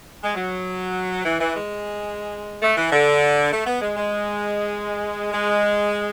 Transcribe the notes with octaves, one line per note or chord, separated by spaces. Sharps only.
G#3
F#3
E3
E3
G#3
A3
E3
D3
A3
B3
G#3
G#3
G#3